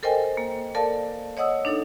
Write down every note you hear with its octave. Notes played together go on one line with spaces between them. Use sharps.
A4 A#4 C5 D#5 G5 G#5
A#3
A4 A#4 D5 F5 A5
C#5 D#5 F#5 D#6 E6
D4 D#4 A4